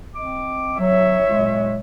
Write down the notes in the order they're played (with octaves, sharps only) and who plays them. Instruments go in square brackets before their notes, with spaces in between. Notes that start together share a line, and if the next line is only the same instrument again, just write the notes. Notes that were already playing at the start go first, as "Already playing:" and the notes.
[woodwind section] C4 D#5 D6
[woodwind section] F#3 [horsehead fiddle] C#5 E5
[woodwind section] A#2 F#3 G#3